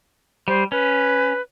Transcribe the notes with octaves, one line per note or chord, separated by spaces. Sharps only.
G3 C5
C#4 B4